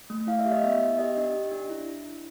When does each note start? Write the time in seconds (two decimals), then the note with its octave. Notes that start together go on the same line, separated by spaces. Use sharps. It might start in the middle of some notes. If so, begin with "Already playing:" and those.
0.10 A3
0.27 E4 F5
0.39 E5
0.45 G4
0.52 D#5
0.63 B3 E5
0.80 B3
0.98 G4 D#5
1.17 D4
1.33 G4
1.52 D4
1.70 E4